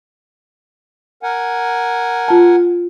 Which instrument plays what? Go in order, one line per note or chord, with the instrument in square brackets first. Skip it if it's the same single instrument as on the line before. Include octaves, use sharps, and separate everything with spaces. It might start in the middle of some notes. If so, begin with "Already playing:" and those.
[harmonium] A#4 F#5 G#5
[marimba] F4 A5